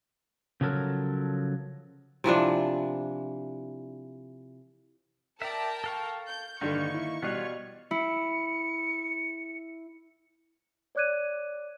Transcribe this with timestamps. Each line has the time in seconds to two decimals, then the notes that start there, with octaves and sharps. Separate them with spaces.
0.61 C#3 F3 F#3 A4 A#4
2.24 C3 E3 F3 D4
5.42 A#4 D5 E5 G5 A5
5.84 A4 F5 C#6
6.27 G6
6.61 G2 D3 D#3 A#3 D#4 C#6
6.94 E4
7.22 B2 G3 B3 F4 C#5 F#6
7.91 E4 C#7
10.95 C#5 D5 D6 F#6 G#6 D#7